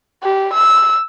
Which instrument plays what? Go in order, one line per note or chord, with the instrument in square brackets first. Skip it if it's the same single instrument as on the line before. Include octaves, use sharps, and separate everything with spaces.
[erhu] G4
E6